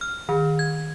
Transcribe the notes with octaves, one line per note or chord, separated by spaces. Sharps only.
F6
D#3
G#6